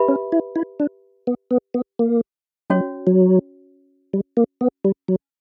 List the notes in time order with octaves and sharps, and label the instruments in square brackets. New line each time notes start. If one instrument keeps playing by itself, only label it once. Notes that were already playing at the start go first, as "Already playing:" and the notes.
Already playing: [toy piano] G4 B4 E5 B5
[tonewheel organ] C#4
E4
E4
D4
B3
B3
B3
A#3
[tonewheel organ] F#3 [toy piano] C#4 F#4 C#5
[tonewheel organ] F#3
G3
A#3
B3
G3
F#3